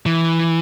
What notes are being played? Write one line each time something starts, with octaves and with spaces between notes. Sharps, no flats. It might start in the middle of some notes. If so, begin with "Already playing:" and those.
E3